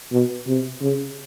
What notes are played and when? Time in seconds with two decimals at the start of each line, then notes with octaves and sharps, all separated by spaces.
0.12 B2
0.48 C3
0.81 C#3